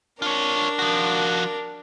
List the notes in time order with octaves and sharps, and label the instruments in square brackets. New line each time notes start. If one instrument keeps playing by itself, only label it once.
[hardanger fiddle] D4 A#4 [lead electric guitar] F4 C#5
[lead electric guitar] F3 F#4